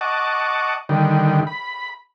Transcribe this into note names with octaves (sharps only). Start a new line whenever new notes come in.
D#5 F#5 A5 C#6 D6
D3 D#3 G3
B5